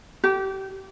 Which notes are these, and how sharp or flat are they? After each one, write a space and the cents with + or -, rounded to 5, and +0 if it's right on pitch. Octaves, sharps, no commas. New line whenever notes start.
G4 -25